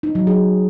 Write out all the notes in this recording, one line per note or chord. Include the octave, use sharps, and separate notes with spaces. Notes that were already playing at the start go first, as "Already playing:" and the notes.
D#4
F#3
G#4